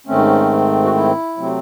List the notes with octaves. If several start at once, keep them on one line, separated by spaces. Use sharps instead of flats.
G#2 D#3 A3 C4 C#4
F#4
E4
C3 F#3 A3 C4